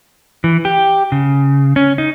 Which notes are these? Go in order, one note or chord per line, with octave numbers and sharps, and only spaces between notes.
E3
G4
C#3
C#4
D#4